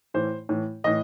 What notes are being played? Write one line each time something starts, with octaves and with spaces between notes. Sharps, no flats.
A2 E3 C5
A2 E3
A2 E3 D#5